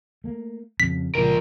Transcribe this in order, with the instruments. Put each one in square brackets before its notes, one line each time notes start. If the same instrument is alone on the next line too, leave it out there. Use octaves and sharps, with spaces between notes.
[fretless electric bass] A3 A#3
[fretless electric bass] F2 C#3 [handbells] B6
[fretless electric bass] C#2 A#2 C#3 [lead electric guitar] F3 A#4